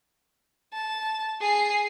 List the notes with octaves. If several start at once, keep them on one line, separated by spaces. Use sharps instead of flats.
A5
G#4 C7